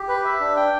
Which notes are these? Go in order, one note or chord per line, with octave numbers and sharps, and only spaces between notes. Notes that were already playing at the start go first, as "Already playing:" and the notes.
Already playing: G4
B4
E5
D4
G5